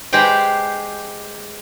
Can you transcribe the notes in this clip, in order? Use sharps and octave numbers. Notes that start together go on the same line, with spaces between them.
G#3 G4 B4 C5 G5